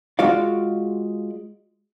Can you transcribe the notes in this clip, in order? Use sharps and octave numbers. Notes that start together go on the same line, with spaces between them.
G#3 F4 F#4 D5 F5